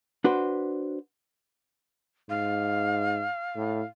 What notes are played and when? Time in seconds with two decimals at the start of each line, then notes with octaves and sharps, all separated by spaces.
0.24 D4 F#4 B4 C5
2.30 G#2 F5
3.56 A2